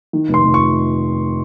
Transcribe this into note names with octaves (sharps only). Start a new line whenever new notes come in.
D#3
F1
C6
F1
C#6